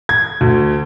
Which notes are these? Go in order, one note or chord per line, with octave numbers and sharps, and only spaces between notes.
G#6
D2